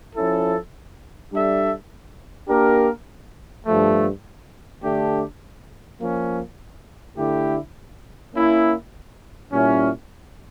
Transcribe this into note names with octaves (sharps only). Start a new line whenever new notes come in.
F3 C#4 E4 A4
G3 D4 A4 E5
A#3 D4 G4 A#4
G2 F3 A3
D3 A3 D4 G4
F3 A#3 C#4
D3 A3 E4 G4
A#3 C#4 E4
A#2 G3 C#4 E4